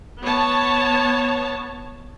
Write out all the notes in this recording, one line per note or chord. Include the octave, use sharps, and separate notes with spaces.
B3 C#5 A5